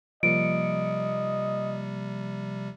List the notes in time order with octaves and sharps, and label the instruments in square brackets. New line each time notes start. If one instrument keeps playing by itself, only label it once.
[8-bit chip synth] C3 G3 [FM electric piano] F3 A#3 C#7 [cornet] D#5 [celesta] D7